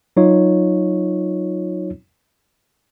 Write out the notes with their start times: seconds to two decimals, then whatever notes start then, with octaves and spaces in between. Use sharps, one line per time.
0.17 F#3 D#4 F4 C#5